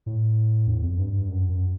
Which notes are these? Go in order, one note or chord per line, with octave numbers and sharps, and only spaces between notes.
A2
E2
F2
G2
G2
F#2
F#2